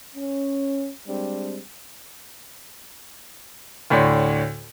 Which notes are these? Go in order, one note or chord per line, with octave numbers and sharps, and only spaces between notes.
C#4
G3 G#3 C4 D4
D2 A2 C#5 D5 C6